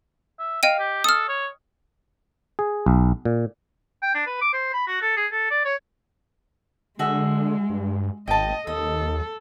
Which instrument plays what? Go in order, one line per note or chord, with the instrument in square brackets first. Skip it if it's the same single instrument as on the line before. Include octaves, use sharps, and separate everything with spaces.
[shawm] E5
[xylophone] D#5 G5 D#7 [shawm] F5
[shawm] G4
[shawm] A4 [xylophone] D#6 F6
[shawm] C#5
[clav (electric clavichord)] G#4
B1
A#2
[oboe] G5
D4
B4
D6
C5
B5
F#4
A4
G#4
A4
D5
C#5
[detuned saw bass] D3 [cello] G#3 [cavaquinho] F#4 G#4 E5
[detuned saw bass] G2
[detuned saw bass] G#1 [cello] D#5 [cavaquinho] G5 A5
[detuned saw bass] D#2 [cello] A4 [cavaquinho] D#5